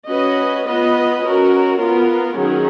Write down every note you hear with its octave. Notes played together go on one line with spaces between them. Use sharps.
C#4 F#4 B4 D#5
B3 F4 B4 D#5
C#4 F#4 A#4
B3 F4 A#4
D#3 F#3 C#4 G#4